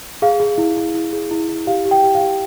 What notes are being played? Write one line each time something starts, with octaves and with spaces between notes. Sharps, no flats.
G#4 F5
G#4
E4
E4
E4
G#4
E4
E4
G4 F5
G4
G5
G4
F5
G4